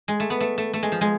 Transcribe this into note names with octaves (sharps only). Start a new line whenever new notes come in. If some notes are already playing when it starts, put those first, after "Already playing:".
G#3
A3
B3
A3
A3
A3
G#3
F3
G#3